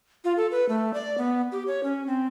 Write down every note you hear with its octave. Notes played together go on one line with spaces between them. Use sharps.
F4
A4
B4
A3
D5
B3
G4
C#5
C#4
C4